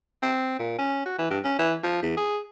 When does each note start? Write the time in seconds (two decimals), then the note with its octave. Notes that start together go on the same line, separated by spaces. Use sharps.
0.23 C4
0.59 A#2
0.79 C#4
1.05 F#4
1.19 E3
1.30 G2
1.44 C#4
1.59 E3
1.83 F3
2.03 E2
2.17 G#4